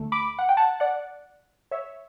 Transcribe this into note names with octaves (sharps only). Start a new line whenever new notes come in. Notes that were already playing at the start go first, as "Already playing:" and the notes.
Already playing: D2 D3 A3
B5 D6
F#5
G5
F#5 A5
D5 F#5
C#5 E5